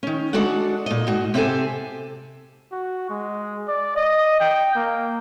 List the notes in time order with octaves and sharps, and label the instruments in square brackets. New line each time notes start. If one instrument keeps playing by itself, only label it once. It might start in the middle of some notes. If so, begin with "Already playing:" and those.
[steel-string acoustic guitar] D#3 C#4
G#3 D4 F#4 A4 D5 F#5
A#2 D#5
G#2 F#4
C3 C4 F#4 G4 A4 G#5
[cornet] F#4
G#3
D5
D#5
G5
A#3